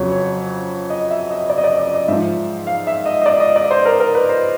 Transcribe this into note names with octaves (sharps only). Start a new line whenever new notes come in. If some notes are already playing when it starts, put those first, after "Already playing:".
Already playing: F2 C#3 F#3 C#5
C#5
D#5
E5
D#5
D5
D#5
D5
D5
D#5
G#2 F3 E5
F5
E5
D#5
D#5
D5
D#5
D5
C5
A#4
A#4
B4
C5